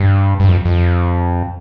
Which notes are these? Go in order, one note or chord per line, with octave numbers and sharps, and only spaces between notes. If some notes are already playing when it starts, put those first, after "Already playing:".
Already playing: G2
G2
F2
F2